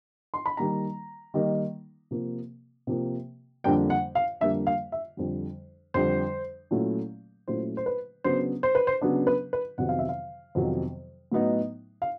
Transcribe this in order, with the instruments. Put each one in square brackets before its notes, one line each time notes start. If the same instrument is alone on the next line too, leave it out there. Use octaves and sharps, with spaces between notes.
[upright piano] C6
B5
D#3 G3 A#3 D#4 A#5
D#3 G3 A#3 D#4
C3 F3 A#3
C3 F3 A#3
F2 D3 G3 A#3 D4 G5
F#5
F5
F2 D3 G3 A#3 D4 E5
F5
E5
F2 D3 G3
F2 D3 G3 C5
A#2 F#3 A3 C#4 E4
A#2 F#3 A3 C#4 E4 C5
C5
B4
C#3 F#3 B3 D4 C5
C5
B4
C5
C#3 F#3 B3 D4
B4
B4
F2 C3 D#3 F#3 B3 F#5
F5
E5
F5
F2 C3 D#3 F#3 B3
A2 F#3 B3 D#4
F5